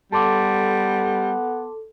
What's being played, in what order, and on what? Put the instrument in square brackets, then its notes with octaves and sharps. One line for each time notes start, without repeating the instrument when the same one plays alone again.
[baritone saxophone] G3 [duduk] B3 [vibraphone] A4 [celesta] A5 C6 D6